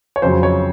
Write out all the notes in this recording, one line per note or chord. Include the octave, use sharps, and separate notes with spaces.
C#5
F2 C#3 F#3 C5
C#5